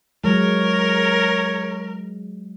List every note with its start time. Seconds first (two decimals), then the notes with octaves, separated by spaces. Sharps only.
0.24 F#3 G#3 A#4 C#5